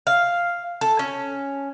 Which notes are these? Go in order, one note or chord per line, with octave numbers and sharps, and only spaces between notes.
F5
A4
C#4